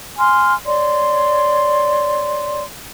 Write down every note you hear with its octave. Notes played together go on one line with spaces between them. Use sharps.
G#5 C6 F6
C#5 D5 C6